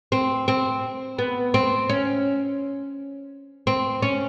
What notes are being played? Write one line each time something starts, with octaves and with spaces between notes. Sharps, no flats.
C4
C4
B3
C4
C#4
C4
C#4